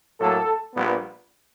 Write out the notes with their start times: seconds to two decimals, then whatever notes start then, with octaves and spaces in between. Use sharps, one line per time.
0.19 A2 F#3 A#3 A4
0.75 A#1 A#2 G3 B3